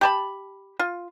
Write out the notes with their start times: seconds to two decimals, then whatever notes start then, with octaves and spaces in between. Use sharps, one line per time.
0.01 G4 A5 B5
0.79 F4